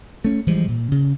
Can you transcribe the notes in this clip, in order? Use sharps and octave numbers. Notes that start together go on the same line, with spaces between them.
A3 C#4
E3 F3 G3 G#3
A#2
C#3